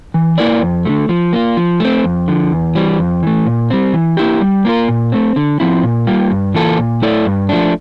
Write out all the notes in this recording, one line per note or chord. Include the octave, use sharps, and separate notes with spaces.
E3
A#3 E4 A#4 D5
F2
D3 F3 A3
F3
A#3 F4
F3
A3 C4
F2
D3 F3
E2
E3 G3 C4
F2
E3 A3
A#2
G3 C4
E3
A#3 E4 G4
G3
A#3 F4 A#4
A#2
A3 C4
D3
F3 C4 E4
A#2
G3 A#3 F4
G2
E3 A#3 F4 A4
A#2
A3 E4 A4 D5
G2
F3 A3 D4